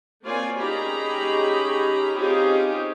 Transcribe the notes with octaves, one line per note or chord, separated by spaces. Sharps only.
A#3 C4 F4 C#5 D5 G#5
C#4 D#4 G4 G#4 A#5 B5
C4 C#4 D#4 F4 G4 G#4